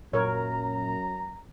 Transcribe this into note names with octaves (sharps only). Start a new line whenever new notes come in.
F#2 A#2 A#4 C#5 A#5